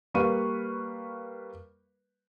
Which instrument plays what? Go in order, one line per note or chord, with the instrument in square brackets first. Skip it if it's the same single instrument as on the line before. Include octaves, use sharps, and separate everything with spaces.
[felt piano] G3 A#3 B4 F5 C#6 D#7